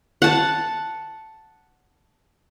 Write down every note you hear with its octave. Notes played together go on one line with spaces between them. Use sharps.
F#5 A5